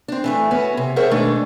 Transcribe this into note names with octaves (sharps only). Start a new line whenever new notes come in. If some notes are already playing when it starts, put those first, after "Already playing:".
C4 D4
E3 G3 A3
B3 C#4 F#4
C3
G#4 A#4 C5 C#5 E5 F#5
B2 D#3 G#3 A3 D4 C5